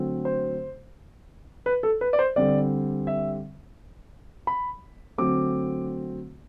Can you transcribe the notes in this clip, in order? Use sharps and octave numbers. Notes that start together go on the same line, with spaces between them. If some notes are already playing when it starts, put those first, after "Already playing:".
Already playing: D3 F#3 A3 C4
C5
B4
A4
B4
D5
C5
D3 G3 C4 D5
E5
B5
D3 F#3 A3 C4 D6